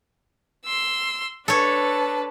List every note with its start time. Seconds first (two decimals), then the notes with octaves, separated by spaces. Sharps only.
0.66 C6 E6
1.48 D4 A4 B4 C#5 A5